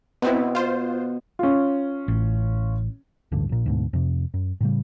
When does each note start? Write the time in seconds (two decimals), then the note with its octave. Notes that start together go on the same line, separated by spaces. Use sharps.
0.22 B2 B3 C4 E4
0.55 F4 C5
1.39 C#4 F4
2.08 A1
3.32 D1 A1 G2 D3
3.49 A#1 A#2
3.66 D2 G#2 B2
3.93 F2 C3
4.34 F#2
4.61 A2 C#3 G3